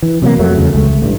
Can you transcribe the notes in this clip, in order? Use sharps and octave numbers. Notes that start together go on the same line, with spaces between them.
E3
C3 F#3 G3 A#3
F2 F#3 A3
E2 C#3
C#2 A3
A1 G2